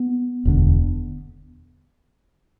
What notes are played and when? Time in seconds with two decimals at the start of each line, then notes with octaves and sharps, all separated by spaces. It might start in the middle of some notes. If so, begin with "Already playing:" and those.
Already playing: B3
0.45 E1 D2 D3